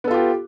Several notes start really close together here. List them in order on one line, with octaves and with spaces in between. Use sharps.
B3 A4 F4 G4